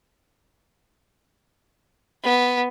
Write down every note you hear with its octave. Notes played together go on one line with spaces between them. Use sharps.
B3